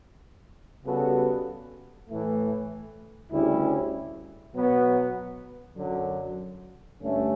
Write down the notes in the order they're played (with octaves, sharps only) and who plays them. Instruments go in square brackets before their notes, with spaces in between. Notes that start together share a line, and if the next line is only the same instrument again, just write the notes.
[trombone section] C#3 G3 B3 F#4 A4
A2 E3 A3
D2 C#3 G3 C#4 E4
B2 F#3 B3
F#2 D3 F#3
G2 D3 A3 C#4